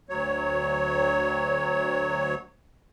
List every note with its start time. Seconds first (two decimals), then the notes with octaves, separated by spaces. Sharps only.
0.09 D2 F#3 C#5